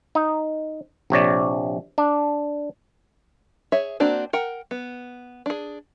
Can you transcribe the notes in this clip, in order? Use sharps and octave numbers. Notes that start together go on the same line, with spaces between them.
D#4
A#1 C3 C#5 D5
D4
G#4 C#5 E5
A#3 C4 D4 F#4 C5
A#4 F#5 G5
B3
D4 G#4